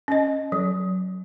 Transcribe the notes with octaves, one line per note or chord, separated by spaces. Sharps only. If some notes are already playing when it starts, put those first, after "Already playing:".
C#4 D#5
F#3